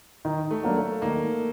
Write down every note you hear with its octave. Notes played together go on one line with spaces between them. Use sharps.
D#3
A3
F#3 A#3 D4
A3
D#3 A#3